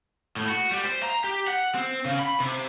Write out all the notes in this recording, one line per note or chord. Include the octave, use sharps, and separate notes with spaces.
A2
F#4
G3
C5
A#5
G4
F#5
C4
C#3
B5
C3